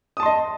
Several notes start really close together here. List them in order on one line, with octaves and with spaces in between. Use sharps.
D#6 A5 C6 D#5